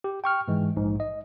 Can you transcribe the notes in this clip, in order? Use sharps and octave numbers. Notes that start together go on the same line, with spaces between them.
G4
G5 C#6 F6
G#2 E3 G#3
A#1 G#2
D#5